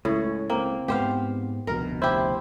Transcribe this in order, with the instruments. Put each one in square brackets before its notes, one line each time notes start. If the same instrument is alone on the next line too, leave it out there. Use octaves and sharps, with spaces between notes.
[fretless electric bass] C#2 [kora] A2 [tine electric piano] C#5
[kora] A#3 [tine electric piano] C4
[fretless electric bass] G#2 B3 [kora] G4 C5 F5
[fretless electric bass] F1 D2 B2 [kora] A#4
[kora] E4 G4 [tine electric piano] C5